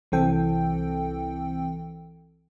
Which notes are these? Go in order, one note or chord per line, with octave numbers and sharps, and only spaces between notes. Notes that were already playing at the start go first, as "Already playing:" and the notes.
C2 E3 C4 A4 G5